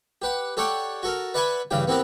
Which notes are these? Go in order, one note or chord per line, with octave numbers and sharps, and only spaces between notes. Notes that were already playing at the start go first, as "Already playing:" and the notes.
G4 B4 F#5
G4 A4 C#5 D5 F#5 G5
F#4 A4 A#4
B4 D5 E5 F#5 G#5 B5
G2 C#3 E3 G4 G5
B3 C4 E4 G4 A#4 B4